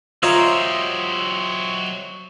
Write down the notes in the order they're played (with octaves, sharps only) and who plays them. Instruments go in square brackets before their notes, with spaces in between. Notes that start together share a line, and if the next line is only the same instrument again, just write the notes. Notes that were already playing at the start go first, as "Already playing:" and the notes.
[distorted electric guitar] F#3 G4 [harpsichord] F4 C#5 A#5 [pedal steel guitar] C5 D#5 E5